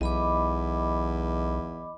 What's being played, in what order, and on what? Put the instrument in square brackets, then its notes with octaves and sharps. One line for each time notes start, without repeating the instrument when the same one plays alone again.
[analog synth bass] B1 [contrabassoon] E2 [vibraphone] D#5 B5 D6